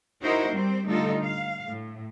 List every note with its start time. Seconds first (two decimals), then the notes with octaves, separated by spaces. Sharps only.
0.22 D#4 E4 F#4 A#4 C5
0.52 G3 C4 C5
0.86 D3 G3 A3 D#4 F4 A4
1.24 F5
1.67 A2